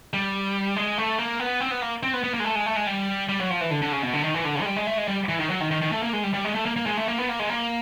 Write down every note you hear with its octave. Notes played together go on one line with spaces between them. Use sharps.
G3
G#3
A3
A#3
B3
C4
B3
A#3
C4
B3
B3
A#3
G#3
A3
G#3
A3
G#3
G3
G3
F#3
F3
E3
D3
D3
C#3
B2
D3
D#3
E3
D3
C#3
G#3
G3
G#3
A3
G#3
G3
E3
D#3
F#3
D#3
D#3
D#3
A3
A#3
G#3
G3
G3
G#3
A3
A#3
A#3
G#3
A3
A#3
B3
A#3
G#3
A#3